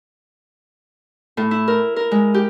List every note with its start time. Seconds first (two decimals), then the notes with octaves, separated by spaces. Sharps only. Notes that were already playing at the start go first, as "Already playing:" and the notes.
1.37 A2
1.51 E4
1.68 A#4
1.96 A#4
2.11 G#3
2.34 G4